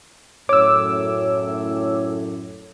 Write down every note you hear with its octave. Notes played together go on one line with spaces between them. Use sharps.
F#2 A2 C#5 D6 E6